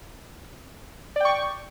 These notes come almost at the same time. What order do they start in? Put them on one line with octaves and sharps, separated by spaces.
D5 G5 C#6